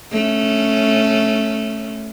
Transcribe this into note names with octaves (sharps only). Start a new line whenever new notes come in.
A3 C#4